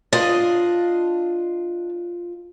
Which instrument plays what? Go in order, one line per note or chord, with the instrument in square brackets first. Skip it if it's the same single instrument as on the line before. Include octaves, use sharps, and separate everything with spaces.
[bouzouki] D4 D#5 [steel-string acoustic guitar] F4